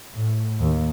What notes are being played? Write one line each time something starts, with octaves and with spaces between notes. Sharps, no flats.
A2
D#2